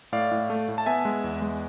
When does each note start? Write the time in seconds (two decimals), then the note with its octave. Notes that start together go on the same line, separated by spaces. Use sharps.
0.12 A2 D5 F5
0.31 A2
0.50 A3
0.68 A2
0.78 A5
0.86 B3 E5 G#5
1.05 G#3
1.24 E2
1.42 G#3